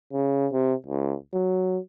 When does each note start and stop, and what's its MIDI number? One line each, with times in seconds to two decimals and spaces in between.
0.13 0.47 49
0.52 0.74 48
0.87 1.15 37
1.34 1.78 54